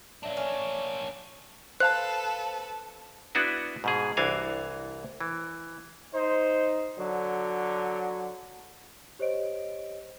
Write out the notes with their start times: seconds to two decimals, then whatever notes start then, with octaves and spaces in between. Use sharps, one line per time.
0.23 A#3 D4 C#5 D5 E5
0.37 C#4
1.80 A4 B4 C5 F5 A5 F#6
3.35 B3 D4 E4 F#4 B4
3.84 G#2 B2 G#4
4.17 C2 E3 D4 F#4 F5 G#5
5.21 E3
6.14 D#4 C5
6.98 D3 F#3
9.19 G4 C5 C#5 D#5 D7